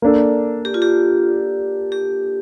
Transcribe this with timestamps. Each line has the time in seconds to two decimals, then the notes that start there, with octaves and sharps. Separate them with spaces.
0.02 A#3 D4 A4
0.65 G4
0.74 F4
0.82 G4
1.92 G4